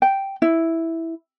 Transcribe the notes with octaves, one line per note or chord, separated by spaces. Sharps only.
G5
E4